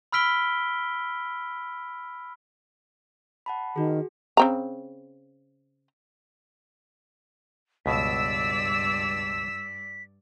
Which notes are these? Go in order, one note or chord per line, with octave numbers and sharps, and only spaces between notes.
B5 E6 F6 B6 D7 G7
F#5 A5 B5
D#3 F#4 G#4
C#3 C4 A#5
C#2 G2 B2 D5 E6 B6